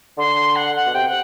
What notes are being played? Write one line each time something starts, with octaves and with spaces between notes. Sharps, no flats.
D3 C6
F#5
F#5
B2
C3 G5
F#5